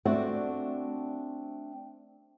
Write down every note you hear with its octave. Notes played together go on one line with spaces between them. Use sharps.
A3 C4 D4 F#4 D5 F#5